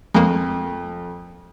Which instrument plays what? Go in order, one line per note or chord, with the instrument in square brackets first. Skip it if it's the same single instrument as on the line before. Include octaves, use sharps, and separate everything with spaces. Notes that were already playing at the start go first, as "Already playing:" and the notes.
[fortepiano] F2 [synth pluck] G#3 A#3